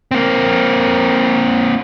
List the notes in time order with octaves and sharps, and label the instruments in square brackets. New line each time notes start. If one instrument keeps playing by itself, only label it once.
[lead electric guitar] A#3 C4